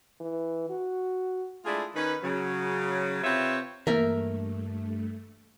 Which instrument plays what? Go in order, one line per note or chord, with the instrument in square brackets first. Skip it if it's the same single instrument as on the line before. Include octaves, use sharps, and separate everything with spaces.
[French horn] E3
F#4
[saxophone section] G#3 A3 D4 E4 F4 G#4
D#3 C#4 D#4 B4
C#3 F#3
C3 C4 F4 B4 C#5 E5
[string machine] G2 A3 [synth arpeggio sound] E3 A#3 [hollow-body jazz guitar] A#4 E5